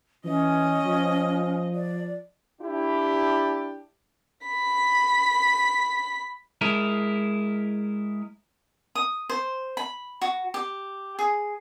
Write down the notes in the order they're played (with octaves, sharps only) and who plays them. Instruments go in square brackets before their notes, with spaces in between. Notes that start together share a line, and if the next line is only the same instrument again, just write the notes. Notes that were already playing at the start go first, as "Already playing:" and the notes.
[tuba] E3 [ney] C#4 [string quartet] D#5
[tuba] F3
[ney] D5
[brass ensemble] D4 E4 G4
[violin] B5 B6
[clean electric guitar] G#3 E4 A#4
[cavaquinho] D#6
C5
B5
F#4
G4
G#4